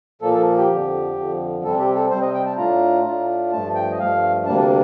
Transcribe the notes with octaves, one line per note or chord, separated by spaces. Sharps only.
A#2 F3 A#3 A4
A4
G4
F2 D3 F3
F2 D3 F3
C3 G3 C4 A4
G4
A4
C3 G3 C4 C5
D#5
G5
A5
A2 A3 D4 F4 A#5
A2 A3 D4 F4
G2 F3 A3 A5
G5
D#5
G2 F3 A3 F5
D2 C3 G3 A#3 D4 A5